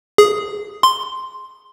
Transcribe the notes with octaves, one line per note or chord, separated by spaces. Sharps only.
G#4
C6